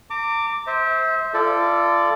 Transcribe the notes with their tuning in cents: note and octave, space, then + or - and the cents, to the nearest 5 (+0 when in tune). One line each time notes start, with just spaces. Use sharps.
A#5 -45 D6 +0
C5 +0 E5 -35
F4 -35 A4 +0 D5 +0